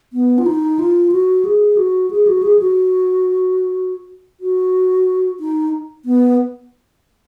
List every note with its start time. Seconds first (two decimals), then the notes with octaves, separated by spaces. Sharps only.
0.13 B3
0.38 F4
0.46 D#4
0.79 F4
1.12 F#4
1.45 G#4
1.77 F#4
2.11 G#4
2.27 F#4
2.43 G#4
2.59 F#4
4.40 F#4
5.40 D#4
6.05 B3